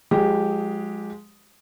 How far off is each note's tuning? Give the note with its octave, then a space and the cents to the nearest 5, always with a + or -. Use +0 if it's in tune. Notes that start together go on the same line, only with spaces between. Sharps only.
F3 +45 G#3 +0 G4 -5